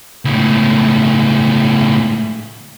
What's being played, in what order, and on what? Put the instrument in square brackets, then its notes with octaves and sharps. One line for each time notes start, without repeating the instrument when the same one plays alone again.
[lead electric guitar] C#2 A2